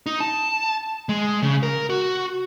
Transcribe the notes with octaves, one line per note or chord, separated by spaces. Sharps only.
D#4
A5
G#3
C#3
A#4
F#4